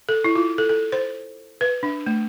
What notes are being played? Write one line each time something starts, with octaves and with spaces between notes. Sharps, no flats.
A4
E4
F4
A4
A4
C5
B4
D4
A3